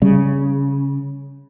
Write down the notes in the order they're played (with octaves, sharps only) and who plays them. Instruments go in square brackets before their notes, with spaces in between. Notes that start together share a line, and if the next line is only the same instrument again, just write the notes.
[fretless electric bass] C#3 [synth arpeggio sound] G3